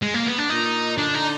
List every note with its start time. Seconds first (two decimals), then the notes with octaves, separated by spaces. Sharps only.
0.02 G#3
0.14 A#3
0.26 B3
0.38 D4
0.50 A#2 D#4
0.97 D3 D4
1.14 D#4